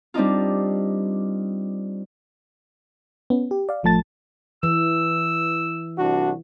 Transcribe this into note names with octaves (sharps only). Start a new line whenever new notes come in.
G3 C4 D4 D#4 F4
B3 C#4
G4
D5 F5
A1 F3 A3 A5 A6
E3 E6
C2 D4 F#4